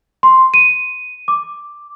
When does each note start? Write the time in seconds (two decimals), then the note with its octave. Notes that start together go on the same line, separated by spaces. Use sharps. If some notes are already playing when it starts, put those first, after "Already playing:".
0.23 C6
0.54 D#7
1.28 D6